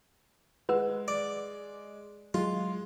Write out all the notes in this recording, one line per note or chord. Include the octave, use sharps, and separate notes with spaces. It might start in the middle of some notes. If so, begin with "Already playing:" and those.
G#3 B4 F#5 E6
D5
F#3 G#3 F4